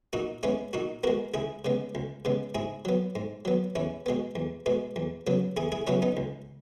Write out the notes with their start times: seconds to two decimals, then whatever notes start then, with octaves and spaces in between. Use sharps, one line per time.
0.13 A#2 D#4 F#4
0.43 G#3 B3 C#4 E4
0.73 A#2 D#4 F#4
1.03 G#3 B3 F#4 A#4
1.34 C#2 E4 G#4
1.65 C#3 G#3 B3
1.95 C#2
2.25 C#3 G#3 B3
2.55 G#2 E4 G#4
2.85 F#3 B3
3.15 G#2
3.45 F#3 B3
3.75 E2 C#4 E4
4.06 B2 G#3 B3
4.35 E2
4.66 B2 G#3 B3
4.96 E2
5.27 C#3 F#3 B3
5.57 E2 E4 G#4
5.72 E4 G#4
5.87 C#3 F#3 B3 C#4 E4
6.02 B3 D#4
6.17 C#2